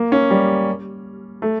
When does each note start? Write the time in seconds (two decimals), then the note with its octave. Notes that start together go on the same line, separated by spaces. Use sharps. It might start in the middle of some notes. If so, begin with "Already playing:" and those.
Already playing: A#3
0.12 C#4
0.30 G3
1.42 A3